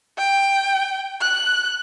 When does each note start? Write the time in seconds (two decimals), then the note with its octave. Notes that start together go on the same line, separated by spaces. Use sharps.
0.18 G5
1.21 F#6